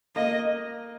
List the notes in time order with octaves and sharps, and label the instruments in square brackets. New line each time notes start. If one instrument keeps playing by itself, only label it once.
[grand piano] A#3 [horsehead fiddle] D#5